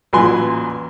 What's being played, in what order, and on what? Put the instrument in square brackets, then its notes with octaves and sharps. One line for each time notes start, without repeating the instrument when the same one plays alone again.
[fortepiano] A1 A#2 F#3 B4 G#5 C6